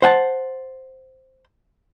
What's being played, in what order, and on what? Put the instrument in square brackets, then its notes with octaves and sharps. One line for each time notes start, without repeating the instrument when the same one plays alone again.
[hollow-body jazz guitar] C5 F#5 G#5 A5